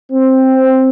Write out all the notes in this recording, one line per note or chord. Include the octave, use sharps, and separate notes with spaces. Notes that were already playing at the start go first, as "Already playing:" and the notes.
C4